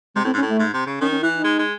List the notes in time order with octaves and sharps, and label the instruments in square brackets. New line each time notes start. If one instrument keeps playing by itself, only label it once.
[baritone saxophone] C3 [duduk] G#3
[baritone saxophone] A2 [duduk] C4
[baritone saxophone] G#2
[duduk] C#4
[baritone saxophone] A2
[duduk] A3
[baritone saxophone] G#2
C3
C#3
[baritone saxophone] D#3 [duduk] C#4
[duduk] C#4
[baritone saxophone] E3 [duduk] E4
[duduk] D#4
[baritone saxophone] G#3
G#3